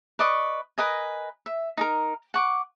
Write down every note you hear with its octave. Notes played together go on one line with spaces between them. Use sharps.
B4 D5 D#5 C#6
A#4 B4 D#5 G#5
E5
D#4 G#4 A#4
F#5 C#6 D6